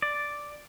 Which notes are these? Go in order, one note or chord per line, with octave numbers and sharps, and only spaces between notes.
D5